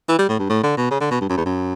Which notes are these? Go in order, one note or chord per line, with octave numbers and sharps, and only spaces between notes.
E3
G3
A2
G2
A2
D3
B2
C#3
D3
B2
G2
F#2
E2
F#2